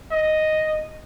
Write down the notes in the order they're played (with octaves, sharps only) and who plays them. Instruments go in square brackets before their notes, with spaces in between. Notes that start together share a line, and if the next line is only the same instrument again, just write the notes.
[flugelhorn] D#5